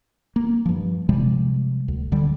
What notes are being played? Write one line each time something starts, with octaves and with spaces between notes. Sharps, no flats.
A#3
G2 F3
C3 F3 G3 G#3
D2
D2 D3 G3